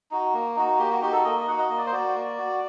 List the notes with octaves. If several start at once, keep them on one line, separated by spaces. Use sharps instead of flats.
D#4 F#4
A#3
D#4 F#4
A#3 G4
F#4
D#4 F#4 G4
A4
A#3 D#5
D#5
D#4 F#4 F#5
D#5
A#3 D#5
D5
C5
F#4 D5
A#3
F#4